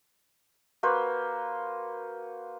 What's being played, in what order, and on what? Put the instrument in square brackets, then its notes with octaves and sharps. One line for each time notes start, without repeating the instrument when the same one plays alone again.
[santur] A#3 F#4 B4 C5